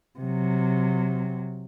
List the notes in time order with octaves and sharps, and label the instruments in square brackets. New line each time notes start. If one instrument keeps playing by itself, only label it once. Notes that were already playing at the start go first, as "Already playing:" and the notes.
[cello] C3 F#3